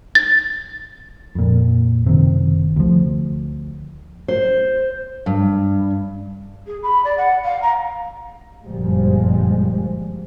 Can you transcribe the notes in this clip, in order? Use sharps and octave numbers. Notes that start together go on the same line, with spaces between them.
A6
F2 A#2
F#1 C3 D#3
D2 F3
C5
G2
G#4
B5
D5
F#5
F5
A#5
G1 F#2 A#2 F3 G3 G#3